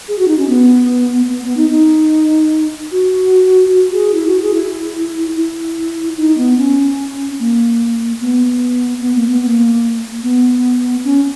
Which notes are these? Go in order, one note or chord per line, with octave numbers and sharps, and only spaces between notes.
G#4
F#4
D#4
C#4
B3
B3
B3
D#4
D#4
F#4
F#4
G#4
E4
F#4
G#4
E4
E4
D#4
B3
C#4
A#3
B3
B3
A#3
B3
B3
A#3
B3
C#4